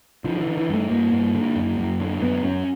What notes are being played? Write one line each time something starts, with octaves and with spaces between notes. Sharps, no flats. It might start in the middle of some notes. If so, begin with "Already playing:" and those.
D3 F3
F3
E3
D3
E3
G2 A3
G2 A#3
G2
D3
F#2
F#2
D3
F#2 B3
F#2 C#4